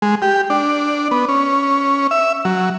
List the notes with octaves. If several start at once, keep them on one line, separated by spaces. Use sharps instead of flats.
G#3
G4
D4
B3
C#4
E5
F#3